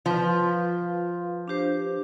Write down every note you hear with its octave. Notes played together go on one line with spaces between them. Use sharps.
F3 F4 B4 F5
D4 G4 C5